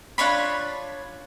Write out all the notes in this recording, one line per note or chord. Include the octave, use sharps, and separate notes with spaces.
D4 F4 C#5 B5